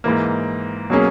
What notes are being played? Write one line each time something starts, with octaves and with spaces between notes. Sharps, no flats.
G#2 E3 A#3
B2 F#3 A#3 C#4 G#4